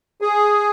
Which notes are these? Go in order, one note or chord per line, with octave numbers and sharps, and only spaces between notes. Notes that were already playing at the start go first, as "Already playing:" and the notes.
G#4